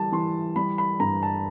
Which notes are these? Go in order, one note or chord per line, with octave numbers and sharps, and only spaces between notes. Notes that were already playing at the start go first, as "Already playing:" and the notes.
Already playing: E3 G3 A5
E3 C6
G3 B5
B5
G2 A#5
A5